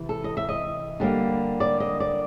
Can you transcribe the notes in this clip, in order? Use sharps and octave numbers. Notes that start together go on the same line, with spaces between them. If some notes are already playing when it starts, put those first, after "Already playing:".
Already playing: C3 E3
A4
D#5
E5
D#5
D3 G3 A#3
D5
D#5
D5